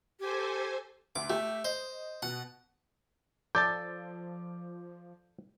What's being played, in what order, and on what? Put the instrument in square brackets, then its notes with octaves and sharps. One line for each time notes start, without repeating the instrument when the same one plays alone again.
[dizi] G4 [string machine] A4 C5 G#5
[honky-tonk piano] D2 [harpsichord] D6
[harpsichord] A3 [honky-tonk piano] G4
[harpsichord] C5 [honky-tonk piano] D#5
[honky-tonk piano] B2 [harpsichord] F#5
[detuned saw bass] F3 [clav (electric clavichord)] A4 D5 A5 [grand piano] D6 G6